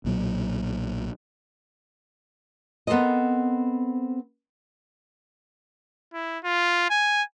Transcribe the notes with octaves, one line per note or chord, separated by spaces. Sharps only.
B1 A#2 D3 F#3
B3 C4 A4 A#4 C5 D#5
E4
F4
G#5